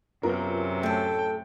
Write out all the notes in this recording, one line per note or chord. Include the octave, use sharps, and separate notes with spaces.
F#2 C3 B3 F4 A#4
A2 A3 A4 G5